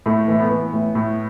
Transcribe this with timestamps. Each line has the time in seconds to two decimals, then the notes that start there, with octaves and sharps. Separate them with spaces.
0.06 A2 A3
0.28 E3 A3
0.39 B3
0.51 E3
0.73 A2
0.95 A2